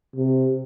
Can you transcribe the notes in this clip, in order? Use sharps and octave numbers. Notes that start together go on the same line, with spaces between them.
C3